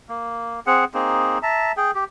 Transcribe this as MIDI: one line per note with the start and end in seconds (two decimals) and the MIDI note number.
0.09 0.60 58
0.67 0.85 60
0.67 0.85 68
0.67 0.85 78
0.94 1.38 58
0.94 1.38 60
0.94 1.38 63
0.94 1.38 68
1.43 1.72 76
1.43 1.72 81
1.43 1.72 82
1.77 1.91 68
1.77 1.91 79
1.95 2.04 67